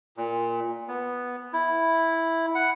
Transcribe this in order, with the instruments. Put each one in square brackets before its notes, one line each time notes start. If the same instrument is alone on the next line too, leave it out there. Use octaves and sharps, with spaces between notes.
[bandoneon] A#2
B3
E4
F#5